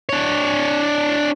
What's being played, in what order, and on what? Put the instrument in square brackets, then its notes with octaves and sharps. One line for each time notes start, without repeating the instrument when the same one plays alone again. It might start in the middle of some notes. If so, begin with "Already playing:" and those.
[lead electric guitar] D4 C#5